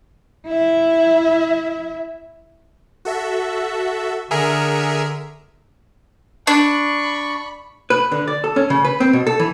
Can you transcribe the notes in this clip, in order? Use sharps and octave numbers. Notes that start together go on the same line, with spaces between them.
E4 E5
F#4 A4 E5
D3 G#4 A#4 E5 C#7
D4 B5 C#6
B4
D3
D5
A4
C#4
C#3
B4
C4
B2
A4
E3